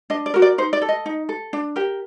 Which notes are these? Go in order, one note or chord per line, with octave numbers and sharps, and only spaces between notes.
D4 D#5
D5
F#4 A#4
D5
D#4 C5
D5
A4
D#5
D#4
A4
D4
G4 A#4